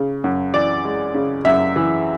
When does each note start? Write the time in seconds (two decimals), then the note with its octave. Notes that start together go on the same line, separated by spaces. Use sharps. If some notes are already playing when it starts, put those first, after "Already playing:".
Already playing: C#3
0.24 F#2
0.54 E3 D5
0.84 G#3
1.14 C#3
1.45 F#2 E5
1.76 E3